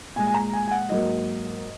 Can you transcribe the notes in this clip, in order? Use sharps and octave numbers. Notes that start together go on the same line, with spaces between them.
A#2 G#3 G#5
G#5
A#5
G#5
G#5
F#5
G#2 F#3 A#3 D#5